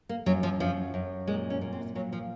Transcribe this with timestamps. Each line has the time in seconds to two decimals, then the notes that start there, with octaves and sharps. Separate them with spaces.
0.09 A#3
0.26 F#2 F#3
0.43 F3
0.60 F#2 F3
0.94 F#2
1.27 A#2 G#3
1.50 C#4
1.61 A#2
1.73 C4
1.95 A#2 F#3
2.13 F3